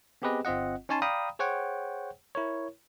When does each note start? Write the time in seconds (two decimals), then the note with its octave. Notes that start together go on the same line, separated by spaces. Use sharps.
0.22 B3 C4 G4 G#4 B4 D#5
0.45 G1 C4 F4 D#5 F#5
0.89 C#4 D#4 C#5 G#5 A5 C6
1.02 D5 F5 G5 A#5 B5 D#6
1.39 G#4 C5 C#5 F#5 G5
2.35 E4 A#4 C#5